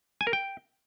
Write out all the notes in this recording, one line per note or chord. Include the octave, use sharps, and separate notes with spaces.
G#5
A#4
G5